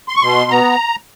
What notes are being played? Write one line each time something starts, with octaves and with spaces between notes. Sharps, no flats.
C6
C#6
B2 C6
B3 A#5